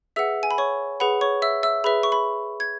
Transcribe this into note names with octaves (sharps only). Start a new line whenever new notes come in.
G#4 B4 E5 F#5 E6
G#5
B5
C#5 C#6
G#4 B4 F#5 B5
C#5 C#6
E5 E6
E5 E6
G#4 B4 E5 B5
C#6
B5
G#6